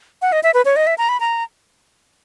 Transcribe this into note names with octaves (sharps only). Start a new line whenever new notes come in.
F#5
D#5
E5
B4
C#5
D#5
E5
A#5
B5
A#5